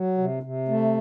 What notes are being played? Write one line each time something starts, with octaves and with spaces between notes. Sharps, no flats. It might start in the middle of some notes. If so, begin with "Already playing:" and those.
Already playing: F#3
C3
C3
A3